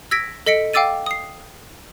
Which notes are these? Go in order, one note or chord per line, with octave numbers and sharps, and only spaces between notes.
E6 G#6 A#6 B6 D7
A4 D#5 B6 C#7 D7
F5 G5 D6 E6 A6 D#7
D#6 C7